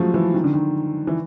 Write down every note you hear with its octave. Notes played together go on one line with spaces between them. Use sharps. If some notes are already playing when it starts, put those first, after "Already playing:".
Already playing: F3 F#3 G#3 A3
E3
D#3
D3
D#3
E3